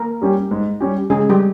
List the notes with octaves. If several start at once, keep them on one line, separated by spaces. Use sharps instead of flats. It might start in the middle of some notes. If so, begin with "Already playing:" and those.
Already playing: A#3 A#4
G3 C#4 G4
G#2
G3 C#4 G4
G4
C#3 G#3 G#4
G3 G4